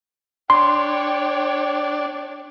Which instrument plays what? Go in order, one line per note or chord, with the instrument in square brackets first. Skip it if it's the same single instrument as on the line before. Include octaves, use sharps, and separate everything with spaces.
[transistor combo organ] D4 [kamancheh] C#5 G5 [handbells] C6